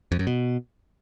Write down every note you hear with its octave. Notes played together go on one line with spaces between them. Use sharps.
F2
F#2
B2